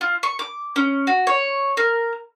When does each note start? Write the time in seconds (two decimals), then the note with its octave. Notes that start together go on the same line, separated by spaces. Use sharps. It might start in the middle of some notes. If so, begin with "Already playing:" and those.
0.01 F4
0.23 C#6
0.39 D6
0.76 C#4
1.07 F#4
1.27 C#5
1.77 A#4